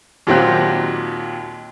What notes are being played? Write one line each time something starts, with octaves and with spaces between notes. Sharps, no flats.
D#2 A#2 F#3 C4 G4 F#6